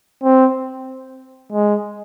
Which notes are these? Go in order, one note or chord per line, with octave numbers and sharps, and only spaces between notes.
C4
G#3